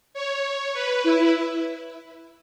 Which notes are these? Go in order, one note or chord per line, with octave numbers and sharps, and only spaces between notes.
C#5
B4
E4